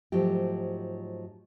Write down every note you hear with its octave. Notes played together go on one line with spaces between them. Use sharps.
G#2 F3 F#3 A3 G4